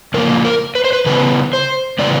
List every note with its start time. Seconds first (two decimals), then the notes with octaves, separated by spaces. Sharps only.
0.14 C#3 F3 A#3 A#4
0.45 A#4
0.75 B4
0.84 C5
0.93 B4
1.06 C#3 E3 G3 B3 B4
1.53 C5
1.99 C#3 E3 G3 B3 D5